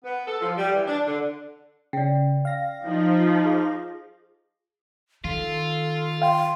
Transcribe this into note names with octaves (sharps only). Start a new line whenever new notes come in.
B3
A4
F3
G3
E3
D4
D3
C#3 D5 G5
F5 A#6
F3 D#4
G#4
D#3 F4 A4
F5 G5 C6